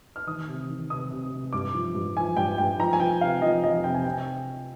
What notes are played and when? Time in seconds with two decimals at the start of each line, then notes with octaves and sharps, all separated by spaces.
0.16 F6
0.27 D#3 D#6
0.48 C3
0.70 D#3
0.90 C3 D#6
1.11 C3
1.32 C3
1.53 G2 D6
1.74 F3
1.95 G2
2.16 F3 G#5
2.37 G2 G5
2.58 G2 G5
2.79 F3 A#5
2.93 G#5
3.00 F3 G5
3.21 C3 F5
3.42 F3 D#5
3.63 F2 D#5
3.84 C3 G5
3.94 G#5
4.05 C3 G5